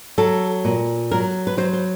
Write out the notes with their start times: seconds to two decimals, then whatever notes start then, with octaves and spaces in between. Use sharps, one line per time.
0.18 F#3 A4
0.65 A#2
1.11 F#3 A#4
1.47 B4
1.57 F#3 C5
1.73 C5